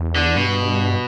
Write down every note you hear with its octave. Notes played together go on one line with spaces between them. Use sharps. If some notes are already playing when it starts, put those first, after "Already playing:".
Already playing: E2
D3
G2 B2